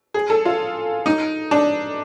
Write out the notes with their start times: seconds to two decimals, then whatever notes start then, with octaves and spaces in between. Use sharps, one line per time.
0.14 G#4
0.30 A4
0.45 F4
1.06 D#4
1.51 D4